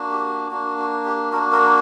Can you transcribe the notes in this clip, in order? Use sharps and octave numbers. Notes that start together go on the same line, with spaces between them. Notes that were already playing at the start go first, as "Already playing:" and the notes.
Already playing: A#3 D4 F#4
G4
A#3 D4 F#4
F#4
G4
A#3 D4 F#4 A#4
A#4